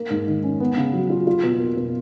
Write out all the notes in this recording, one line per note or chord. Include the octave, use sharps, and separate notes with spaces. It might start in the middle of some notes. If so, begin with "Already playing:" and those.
Already playing: A#3
G#2
D#3
C#4
B3
C#3
F#3
F4
F4
B2
A#3
B2